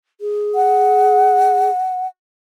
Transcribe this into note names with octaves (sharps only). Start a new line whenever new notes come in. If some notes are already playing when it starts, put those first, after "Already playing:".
G#4
F#5